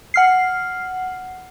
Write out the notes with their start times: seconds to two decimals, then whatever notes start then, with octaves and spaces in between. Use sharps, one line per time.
0.14 F#5 F6 C7